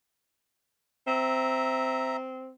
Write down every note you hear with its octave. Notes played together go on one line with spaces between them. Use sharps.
C4 E5 A#5